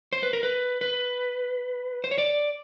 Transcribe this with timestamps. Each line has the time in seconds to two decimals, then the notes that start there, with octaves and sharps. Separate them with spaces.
0.13 C5
0.23 B4
0.33 A#4
0.43 B4
0.81 B4
2.04 C5
2.11 C#5
2.18 D5